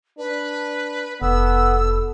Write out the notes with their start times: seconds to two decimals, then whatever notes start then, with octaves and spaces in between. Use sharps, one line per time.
0.18 D4 B4
1.22 F1 B3 A4 E6